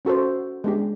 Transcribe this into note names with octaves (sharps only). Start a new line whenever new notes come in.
C#4 F#4 A4 C5
G#3 B3 D4 G4